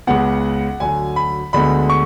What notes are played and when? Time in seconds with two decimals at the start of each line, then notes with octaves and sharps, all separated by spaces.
0.07 C#2 C#3 G#3 B3 F#5
0.80 D2 D3 F#3 G#5
1.16 B5
1.53 D2 D3 G#3 B3 B5
1.90 C#6